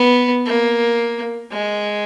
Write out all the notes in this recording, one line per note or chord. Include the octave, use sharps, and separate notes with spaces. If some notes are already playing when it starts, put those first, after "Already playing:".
Already playing: B3
A#3
G#3